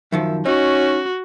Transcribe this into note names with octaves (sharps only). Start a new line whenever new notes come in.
F#2 D#3 F3 E5
C#4 D#4 F#4